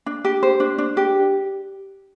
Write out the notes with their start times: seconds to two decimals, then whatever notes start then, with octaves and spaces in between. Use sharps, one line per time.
0.06 D4
0.25 G4
0.43 C5
0.60 D4
0.78 D4
0.97 G4